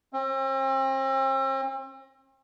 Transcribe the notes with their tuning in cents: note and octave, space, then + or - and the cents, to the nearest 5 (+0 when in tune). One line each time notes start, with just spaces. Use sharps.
C4 +40